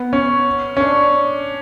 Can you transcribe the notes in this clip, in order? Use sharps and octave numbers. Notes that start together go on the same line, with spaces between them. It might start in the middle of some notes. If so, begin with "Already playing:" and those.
Already playing: B3
C#4
C#4
D4